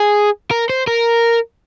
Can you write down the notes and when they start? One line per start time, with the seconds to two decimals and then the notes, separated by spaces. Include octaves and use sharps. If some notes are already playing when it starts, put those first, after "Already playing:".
Already playing: G#4
0.51 A#4
0.70 C5
0.87 A#4